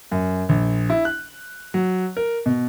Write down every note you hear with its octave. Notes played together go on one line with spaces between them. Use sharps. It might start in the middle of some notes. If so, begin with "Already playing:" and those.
F#2
A#1
E4
F#6
F#3
A#4
B2